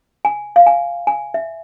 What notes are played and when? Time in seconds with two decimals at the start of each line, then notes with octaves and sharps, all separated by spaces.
0.25 G#5
0.56 F5
0.67 G#5
1.07 G#5
1.34 E5